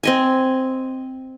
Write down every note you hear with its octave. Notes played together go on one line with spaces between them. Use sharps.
C4 D#5 G#5